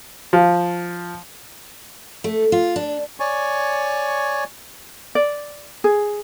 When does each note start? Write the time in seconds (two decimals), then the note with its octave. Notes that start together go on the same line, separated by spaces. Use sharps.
0.33 F3
2.24 A3
2.52 F4
2.76 D4
3.20 C#5 D5 G#5 C#6
5.15 D5
5.84 G#4